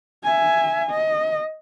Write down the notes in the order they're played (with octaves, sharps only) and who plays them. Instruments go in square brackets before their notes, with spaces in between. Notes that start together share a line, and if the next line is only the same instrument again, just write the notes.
[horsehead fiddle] E5 G#5
D#5